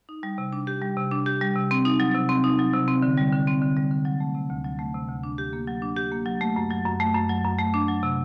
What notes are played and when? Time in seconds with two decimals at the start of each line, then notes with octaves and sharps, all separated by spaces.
0.09 D#4
0.23 G3
0.38 C3
0.53 D4
0.67 G4
0.82 G3
0.97 C3
1.11 D4
1.26 G4
1.41 G3
1.56 C3
1.71 C4
1.85 D#4
2.00 F#3
2.15 C3
2.29 C4
2.44 D#4
2.59 F#3
2.73 C3
2.88 C4
3.02 D3
3.17 G3
3.32 D3
3.47 C4
3.62 D3
3.76 G3
3.91 D3
4.05 F#3
4.20 A3
4.35 C3
4.50 D2
4.65 F#3
4.79 A3
4.94 C3
5.09 D2
5.24 D4
5.38 G4
5.53 A#3
5.67 F#3
5.82 D4
5.96 G4
6.12 A#3
6.26 F#3
6.41 A3
6.56 F#2
6.70 F#3
6.85 F#2
7.00 A3
7.14 F#2
7.29 F#3
7.44 F#2
7.58 A3
7.74 D4
7.88 F#3
8.03 C3